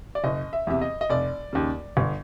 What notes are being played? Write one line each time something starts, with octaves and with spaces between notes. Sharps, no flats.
D5
F#1 D#5
E5
E2 C3 E5
D#5
D#5
F1 D5
D#2 C#3
G1